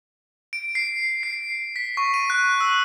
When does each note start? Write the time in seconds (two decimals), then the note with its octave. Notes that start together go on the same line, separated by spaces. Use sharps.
0.53 D7
0.75 C7
1.23 C7
1.76 B6
1.97 C#6
2.14 D#7
2.30 F#6
2.60 E6